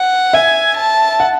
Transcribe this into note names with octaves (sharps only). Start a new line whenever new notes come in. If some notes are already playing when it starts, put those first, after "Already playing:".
Already playing: F#5
E5 G#5
A5
F#5